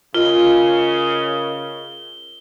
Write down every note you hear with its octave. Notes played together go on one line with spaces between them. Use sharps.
C#3 F4 A#4 D#5 G7